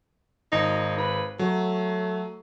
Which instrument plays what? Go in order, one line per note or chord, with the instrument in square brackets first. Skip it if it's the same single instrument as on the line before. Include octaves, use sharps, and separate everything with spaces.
[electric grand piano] G#1 [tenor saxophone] D#4
[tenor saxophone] B4
[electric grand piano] F#3 [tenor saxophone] A3